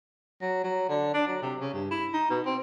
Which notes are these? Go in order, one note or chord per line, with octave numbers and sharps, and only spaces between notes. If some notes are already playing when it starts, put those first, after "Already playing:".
F#3
F#3
D3
D4
F#3
C3
C#3
G2
E4
D#4
B2
C4